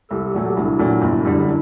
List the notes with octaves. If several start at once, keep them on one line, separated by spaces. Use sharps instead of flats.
C2 G4 A4
A#2 F#3 A3
C2 D4 E4
A#2 F#3 A3
G1
F#2 D3 G3